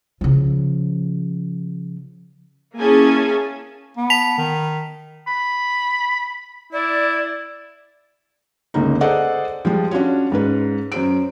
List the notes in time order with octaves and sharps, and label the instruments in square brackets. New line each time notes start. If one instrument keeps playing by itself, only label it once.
[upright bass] C#3 F3
[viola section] A#3 C#4 E4 G#4 G#5 A5
[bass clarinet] B3
[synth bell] A5 B6 F7
[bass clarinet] D#3
[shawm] B5
[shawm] E4 [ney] D5
[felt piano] G1 C#2 A#3 D#4
G#4 A4 C5 D5 D#5 F#5
F3 G3 G#3
C#4 D4 F4 F#4 C#5
G#2 C#4 B4
F#2 C5 D7